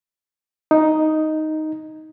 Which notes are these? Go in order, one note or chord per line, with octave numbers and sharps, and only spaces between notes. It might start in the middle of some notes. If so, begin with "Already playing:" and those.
D#4